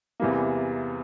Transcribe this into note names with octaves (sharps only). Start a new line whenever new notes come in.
E2 C3 E3 G3 A#3